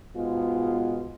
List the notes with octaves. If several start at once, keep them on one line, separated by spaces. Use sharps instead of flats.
G#2 B2 G#3 B3 F4